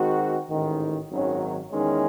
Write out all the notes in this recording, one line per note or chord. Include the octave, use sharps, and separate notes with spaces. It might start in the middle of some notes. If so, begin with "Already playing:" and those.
Already playing: D#3 G#3 C4 F#4
A1 G#2 D#3
G#1 F#2 D#3 F#3 C#4
E2 D#3 G#3 C#4